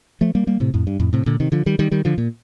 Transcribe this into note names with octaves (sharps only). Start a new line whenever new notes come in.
F3 A3
G3 A#3
G3 A#3
A2 C3
F2 A2
G2
F2 A2
A2 C3
A#2 D3
C3 D#3
D3 F3
D#3 G3
D#3 G3
D#3 G3
D3 F3
A#2